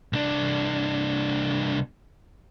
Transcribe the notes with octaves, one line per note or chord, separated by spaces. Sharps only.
C2 D4